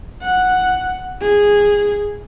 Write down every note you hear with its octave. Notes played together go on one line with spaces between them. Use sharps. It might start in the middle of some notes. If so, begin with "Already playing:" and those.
F#5
G#4